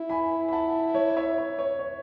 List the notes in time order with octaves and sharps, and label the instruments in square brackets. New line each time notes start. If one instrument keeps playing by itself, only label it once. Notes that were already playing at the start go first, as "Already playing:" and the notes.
Already playing: [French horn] E4
[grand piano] G#5 B5
B5
F#5 A5
C#5
C#5 E5
C#5
C#5
C#5